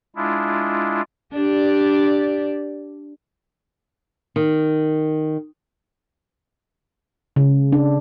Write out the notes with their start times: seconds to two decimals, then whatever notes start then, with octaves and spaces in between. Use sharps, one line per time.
0.16 G#3 D4 E4 F4
1.33 D4 G4 D5
4.36 D#3
7.36 C#3
7.72 D4